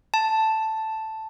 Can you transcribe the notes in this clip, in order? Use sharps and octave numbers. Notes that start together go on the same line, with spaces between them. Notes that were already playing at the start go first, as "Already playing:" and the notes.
A5